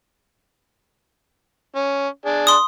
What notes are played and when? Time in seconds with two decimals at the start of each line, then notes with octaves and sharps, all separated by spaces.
1.75 C#4
2.26 D4 G#4
2.47 C6 D#6